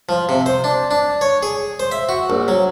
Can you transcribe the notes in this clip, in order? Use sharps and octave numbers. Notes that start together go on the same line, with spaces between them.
F3
C3
C5
D4
D4
C#5
G#4
C5
E5
F#4
A#1
F#3